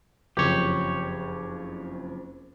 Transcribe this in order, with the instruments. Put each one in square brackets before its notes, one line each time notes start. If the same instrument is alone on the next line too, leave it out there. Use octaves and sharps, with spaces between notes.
[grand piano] F#1 F2 [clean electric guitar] G4 C#5